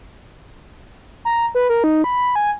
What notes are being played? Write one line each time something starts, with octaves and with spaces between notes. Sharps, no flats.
A#5
B4
A#4
D#4
B5
G#5